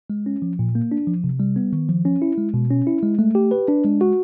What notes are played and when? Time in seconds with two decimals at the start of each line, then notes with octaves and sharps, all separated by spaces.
0.10 G#3
0.26 C#4
0.42 F3
0.59 A#2
0.75 A#3
0.92 D4
1.07 F3
1.24 C3
1.40 G3
1.56 B3
1.73 D#3
1.89 F3
2.05 C#4
2.22 E4
2.38 G#3
2.54 B2
2.70 C#4
2.87 E4
3.03 G#3
3.19 A3
3.35 G4
3.51 B4
3.68 D4
3.85 G#3
4.01 F#4